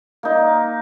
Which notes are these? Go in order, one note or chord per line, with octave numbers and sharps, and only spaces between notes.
A#3 D#4